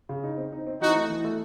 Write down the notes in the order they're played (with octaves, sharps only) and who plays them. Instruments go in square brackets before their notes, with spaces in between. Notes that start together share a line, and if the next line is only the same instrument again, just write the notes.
[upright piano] C#3
D#4
C4
D#4
C4
[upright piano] E3 [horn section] D#4 F#4
[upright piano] A3
E3
A3